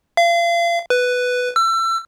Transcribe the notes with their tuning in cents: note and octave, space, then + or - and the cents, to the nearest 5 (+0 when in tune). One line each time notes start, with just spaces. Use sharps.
F5 -35
B4 +5
E6 +30